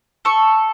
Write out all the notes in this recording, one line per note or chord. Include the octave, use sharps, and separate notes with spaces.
A4 C#6